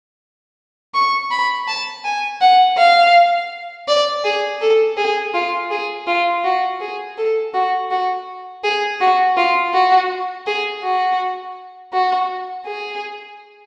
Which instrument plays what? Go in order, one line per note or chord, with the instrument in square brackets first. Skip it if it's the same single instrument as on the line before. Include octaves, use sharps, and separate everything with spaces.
[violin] C#6
B5
A5
G#5
F#5
F5
D5
G#4
A4
G#4
F4
G#4
F4
F#4
G#4
A4
F#4
F#4
G#4
F#4
F4
F#4
G#4
F#4
F#4
G#4